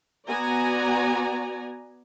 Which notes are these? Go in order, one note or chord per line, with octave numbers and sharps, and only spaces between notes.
B3 F#4 D5 G#5 A#5